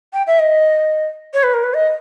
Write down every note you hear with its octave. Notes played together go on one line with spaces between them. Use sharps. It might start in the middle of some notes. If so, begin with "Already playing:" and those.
G5
E5
D#5
C#5
B4
A#4
B4
D#5